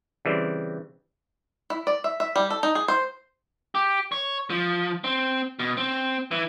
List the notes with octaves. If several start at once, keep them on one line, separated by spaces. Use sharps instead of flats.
C#3 E3 G3 C4
E4
D5
E5
E5
G3
A4
D#4
G#4
C5
G4
C#5
F3
C4
B2
C4
E3